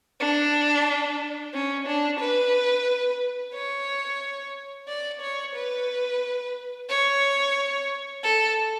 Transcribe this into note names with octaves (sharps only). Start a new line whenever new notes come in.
D4
C#4
D4
B4
C#5
D5
C#5
B4
C#5
A4